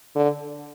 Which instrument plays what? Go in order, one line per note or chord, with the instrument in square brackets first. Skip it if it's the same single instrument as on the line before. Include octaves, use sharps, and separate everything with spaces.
[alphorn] D3